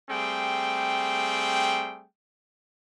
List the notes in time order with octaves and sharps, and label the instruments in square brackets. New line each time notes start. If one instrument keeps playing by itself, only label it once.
[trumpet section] G3 A3 C4 G#4 G5